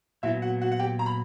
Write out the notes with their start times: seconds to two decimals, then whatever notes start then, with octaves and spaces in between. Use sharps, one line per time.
0.23 A#2 F#3 B3 E4 E5
0.42 F#4 F#5
0.61 F#4 F#5
0.72 F#5
0.79 G4 G5
0.99 A#5
1.06 B5